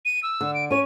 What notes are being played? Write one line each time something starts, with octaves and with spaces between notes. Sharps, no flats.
D#7
E6
D3
D7
C#4 C#5 D#7